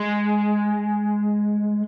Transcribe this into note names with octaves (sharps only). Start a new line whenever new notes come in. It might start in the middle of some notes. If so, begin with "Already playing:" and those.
Already playing: G#3